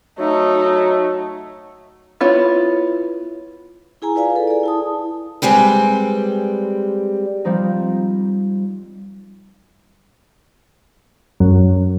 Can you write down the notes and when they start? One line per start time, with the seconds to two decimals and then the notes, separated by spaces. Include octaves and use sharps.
0.19 F#3 A3 D#4
2.21 B3 E4 F4 C#5
4.02 E4 G#4 G#5 A#5
4.15 F4 B4 D5 F5 G#5
4.36 A4 B4
4.47 G#4 D5
4.63 E4 A5 D#6
5.42 G3 G#3 C4 G4 B4
7.45 F3 G3 C4 D#4
11.40 F#2